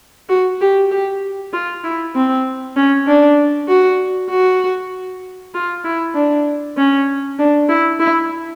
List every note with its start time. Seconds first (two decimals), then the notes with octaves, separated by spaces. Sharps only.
0.29 F#4
0.61 G4
0.91 G4
1.53 F4
1.84 E4
2.15 C4
2.76 C#4
3.07 D4
3.68 F#4
4.30 F#4
5.54 F4
5.85 E4
6.15 D4
6.77 C#4
7.39 D4
7.69 E4
8.00 E4